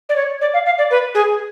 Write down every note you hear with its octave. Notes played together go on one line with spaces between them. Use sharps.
D5
C#5
D5
F5
F5
D5
B4
G#4